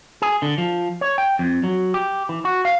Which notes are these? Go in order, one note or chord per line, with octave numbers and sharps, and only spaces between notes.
G#4
D3
F3
C#5
G5
F2
F#3
G4
E3
F#4
F5